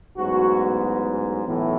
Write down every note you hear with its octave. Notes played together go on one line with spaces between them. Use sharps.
A1 G#2 F#3 B3 F#4
B1 A2 E3 B3